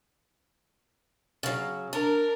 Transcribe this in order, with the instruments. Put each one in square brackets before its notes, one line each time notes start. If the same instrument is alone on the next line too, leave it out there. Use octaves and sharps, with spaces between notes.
[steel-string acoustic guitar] C#3 F#3
[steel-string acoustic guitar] D4 [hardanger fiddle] A#4